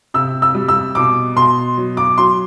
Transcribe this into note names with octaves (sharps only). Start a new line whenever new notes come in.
C3 E6
E6
G3
E6
B2 D6
B2 C6
F#3
D6
F#3 C6